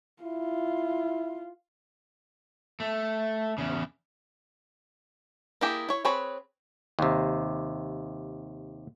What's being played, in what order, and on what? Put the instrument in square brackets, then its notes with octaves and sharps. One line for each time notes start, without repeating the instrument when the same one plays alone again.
[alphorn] E4 [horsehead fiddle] F4
[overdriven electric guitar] A3
E2 C#3
[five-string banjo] A#3 D4 E4 G4 G#4
E4 C#5
C4 G#4 B4 C#5 B5
[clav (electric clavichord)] D#2 C3